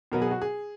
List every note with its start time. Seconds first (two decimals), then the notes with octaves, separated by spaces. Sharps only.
0.12 B2 F#3 B3 A#4
0.22 G#4
0.31 F#4
0.42 G#4